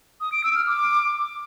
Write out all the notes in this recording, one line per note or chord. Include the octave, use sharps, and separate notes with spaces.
D#6
D7
E6
F6
D6